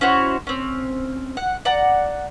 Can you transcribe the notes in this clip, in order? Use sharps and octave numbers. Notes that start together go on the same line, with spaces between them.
C#4 E4 F#4 C5
C4 C#4
F#5
D5 F#5 A#5